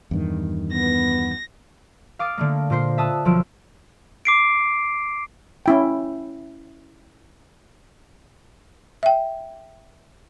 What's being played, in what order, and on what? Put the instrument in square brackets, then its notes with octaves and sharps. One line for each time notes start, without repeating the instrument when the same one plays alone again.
[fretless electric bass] E2 G2 D#3
[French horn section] B3 [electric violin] A#6
[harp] F5 D6 D#6 A6 D7
D3 A3 A#3
A#2 A#3 C5 C7
E5 A5 D#6 E6 F#6
B1 F3 E6 D7
[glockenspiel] D6 C7 D7
[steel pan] C#4 E4 G5
[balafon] E5 G5